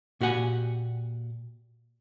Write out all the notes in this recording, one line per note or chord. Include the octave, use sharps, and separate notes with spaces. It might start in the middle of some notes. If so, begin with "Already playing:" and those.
A#2 F#4 G4 F#5 G#5